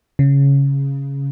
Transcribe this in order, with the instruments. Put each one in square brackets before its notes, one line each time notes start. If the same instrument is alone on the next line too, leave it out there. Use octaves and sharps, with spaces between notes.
[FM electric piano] C#3